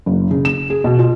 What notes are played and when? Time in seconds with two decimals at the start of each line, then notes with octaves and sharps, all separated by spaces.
0.06 F#1
0.31 C#3
0.45 E7
0.70 G#4
0.84 B2
0.99 F4